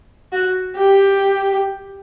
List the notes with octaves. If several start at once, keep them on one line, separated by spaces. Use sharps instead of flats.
F#4
G4